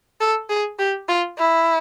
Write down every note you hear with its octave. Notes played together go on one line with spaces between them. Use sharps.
A4
G#4
G4
F4
E4